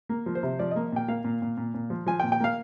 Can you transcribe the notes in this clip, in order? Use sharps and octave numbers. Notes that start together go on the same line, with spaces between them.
A#3
F3
C5
C3
F3 D5
D#5
A#3
A#2 G5
A#3 F5
A#2
A#2
A#2
A#2
F3
F3 G#5
G5
A#2
G5
A#3 F5